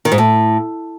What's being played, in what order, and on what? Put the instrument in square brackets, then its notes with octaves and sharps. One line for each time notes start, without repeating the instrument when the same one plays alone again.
[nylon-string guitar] D#3
G#2
A2